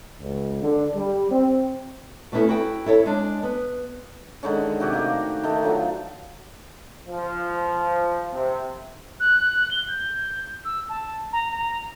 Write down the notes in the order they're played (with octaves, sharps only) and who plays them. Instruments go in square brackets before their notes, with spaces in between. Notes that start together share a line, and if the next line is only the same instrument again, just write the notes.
[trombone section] C#2
D3
G3
C4
[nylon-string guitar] B2 A3 B3 C#4 E4 A4
E4 F#4 A4 G5
E4 A4 C#5
G#3 D4
B3
[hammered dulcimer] D3 D#3 G#3 C#4
C3 F#4 G4 G#5
D#3 A3 A#3
D#3 A3 D#4
D3 F3 F#3
[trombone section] F3
C3
[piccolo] F#6
G7
G6
E6
A5
A#5
A#5